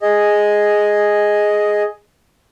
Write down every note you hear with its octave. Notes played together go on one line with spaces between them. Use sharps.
G#4 D#5